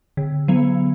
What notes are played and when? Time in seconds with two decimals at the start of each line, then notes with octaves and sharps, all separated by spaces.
0.17 D3
0.48 F#3 B3